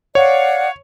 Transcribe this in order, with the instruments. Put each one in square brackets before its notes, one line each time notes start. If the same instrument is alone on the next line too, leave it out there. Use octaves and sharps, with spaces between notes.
[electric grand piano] C#5 [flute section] D5 F5 F#5